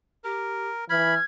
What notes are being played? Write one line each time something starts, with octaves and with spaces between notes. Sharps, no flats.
G4 A#4
E3 B5 F6 G#6